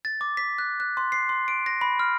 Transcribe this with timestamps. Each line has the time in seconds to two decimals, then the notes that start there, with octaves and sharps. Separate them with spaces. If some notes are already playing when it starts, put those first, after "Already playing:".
0.05 A6
0.21 D6
0.37 B6
0.58 F#6
0.80 F#6
0.97 C6
1.12 C7
1.29 C6
1.48 D7
1.66 A#6
1.81 B5
2.00 F6